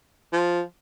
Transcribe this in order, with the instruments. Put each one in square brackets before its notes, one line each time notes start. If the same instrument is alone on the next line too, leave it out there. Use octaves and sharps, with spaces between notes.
[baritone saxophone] F3